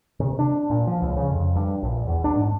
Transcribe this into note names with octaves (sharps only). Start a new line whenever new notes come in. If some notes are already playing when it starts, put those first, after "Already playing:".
C3
D4
A#2
F3
C#2
C#3
F2
G2
A#1
E2
D4
G#2